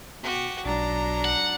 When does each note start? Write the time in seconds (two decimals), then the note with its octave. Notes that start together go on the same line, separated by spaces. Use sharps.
0.23 B2 F#4 G4
0.65 B1 F#3 D4 A#5
1.25 F#5